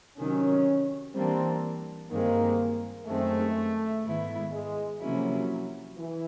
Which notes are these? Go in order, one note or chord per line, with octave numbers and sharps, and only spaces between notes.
C3 D#3 F#3 C#4
E3 G3 A#3 C4 D4
G2 D#3 G#3 A#3 C4
F#2 D#3 G#3 A3 C4
G#2 D#3 G#3 B3 E4
G#3
C3 F3 F#3 A#3 C#4 E4
E3